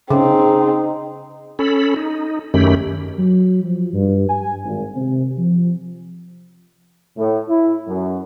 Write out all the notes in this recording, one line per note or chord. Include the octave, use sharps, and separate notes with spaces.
C#3 C4 D#4 G#4
C#4 A4 B5
D#4
F#2 D#3 A3 C#4 G4 B5
F#3
F3
G2
G#5
G#1
C3
F3
A2
E4
F#2